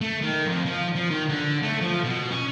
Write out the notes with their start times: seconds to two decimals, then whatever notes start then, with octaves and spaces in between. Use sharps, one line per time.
0.01 A3
0.22 D#3
0.47 F2
0.66 F3
0.96 F3
1.11 D#3
1.29 D3
1.63 A3
1.81 F3
2.03 B2
2.31 C#4